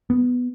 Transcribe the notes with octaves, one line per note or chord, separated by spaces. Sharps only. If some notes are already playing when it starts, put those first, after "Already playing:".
B3